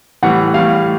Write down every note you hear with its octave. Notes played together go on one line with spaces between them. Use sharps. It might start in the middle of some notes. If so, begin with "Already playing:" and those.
A2 E3 G3 F#5
A2 E3 G3 F5